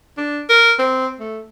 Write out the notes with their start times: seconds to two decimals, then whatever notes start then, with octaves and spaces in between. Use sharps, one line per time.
0.18 D4
0.50 A#4
0.79 C4
1.20 A3